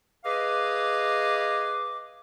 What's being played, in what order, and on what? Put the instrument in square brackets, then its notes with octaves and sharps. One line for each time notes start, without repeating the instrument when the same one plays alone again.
[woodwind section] G#4 B4 D#5 F5 D6